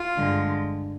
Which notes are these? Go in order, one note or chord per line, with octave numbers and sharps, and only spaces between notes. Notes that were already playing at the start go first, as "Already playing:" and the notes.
Already playing: F4
G2 D3 G#3